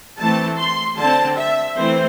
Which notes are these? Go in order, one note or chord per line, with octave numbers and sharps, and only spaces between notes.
E3 A3 C4 A5
C6
D3 C4 A5
E5
E3 A3 C4 C5